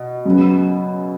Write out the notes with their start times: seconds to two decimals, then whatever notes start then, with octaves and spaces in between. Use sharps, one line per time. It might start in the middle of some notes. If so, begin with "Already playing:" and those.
Already playing: B2
0.25 F#2 C#3 F#3 B3